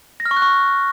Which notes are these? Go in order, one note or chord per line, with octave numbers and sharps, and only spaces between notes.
A#6
F6
C#6
F#6
C#6